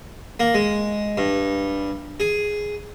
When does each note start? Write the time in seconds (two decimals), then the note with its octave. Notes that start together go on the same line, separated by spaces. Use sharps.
0.40 A#3
0.54 G#3
1.18 G2
2.20 G#4